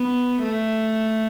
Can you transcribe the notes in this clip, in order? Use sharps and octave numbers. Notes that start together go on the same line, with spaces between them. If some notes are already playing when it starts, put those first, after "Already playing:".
Already playing: B3
A3